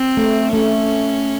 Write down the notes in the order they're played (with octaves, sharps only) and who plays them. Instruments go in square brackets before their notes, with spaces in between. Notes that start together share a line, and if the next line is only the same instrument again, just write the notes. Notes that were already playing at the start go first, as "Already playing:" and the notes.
Already playing: [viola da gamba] C4
[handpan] A3
[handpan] A3 [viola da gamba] C#4